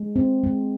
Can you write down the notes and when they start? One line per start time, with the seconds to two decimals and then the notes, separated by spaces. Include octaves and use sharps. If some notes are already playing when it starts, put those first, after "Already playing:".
Already playing: G#3
0.16 C4
0.44 G#3